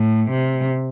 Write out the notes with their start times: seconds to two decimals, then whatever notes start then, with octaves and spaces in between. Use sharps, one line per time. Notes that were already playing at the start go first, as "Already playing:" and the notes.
Already playing: A2
0.30 C3